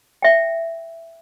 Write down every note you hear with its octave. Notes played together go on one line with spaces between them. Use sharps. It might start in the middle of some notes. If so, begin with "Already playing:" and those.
E5 G5